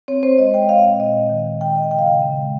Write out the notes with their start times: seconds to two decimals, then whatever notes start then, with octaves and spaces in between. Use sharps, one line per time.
0.08 C4 C#5
0.23 C4 C5
0.38 G#3 D#5
0.54 C4 G5
0.69 C4 F5
0.84 A#2 D#5
1.00 A#2 D#5
1.15 A#2
1.30 D#3
1.45 D#3
1.61 D#3 G5
1.76 C4 D#5
1.91 C#3 G5
1.99 F5
2.06 C#3 G5
2.22 C#3
2.38 G#3